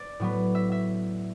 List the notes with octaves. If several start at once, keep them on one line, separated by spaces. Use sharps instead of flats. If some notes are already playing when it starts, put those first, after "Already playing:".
Already playing: D5
A2 F#3 B3
E5
E5